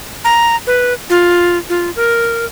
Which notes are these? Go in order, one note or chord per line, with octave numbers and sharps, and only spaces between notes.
A#5
B4
F4
F4
A#4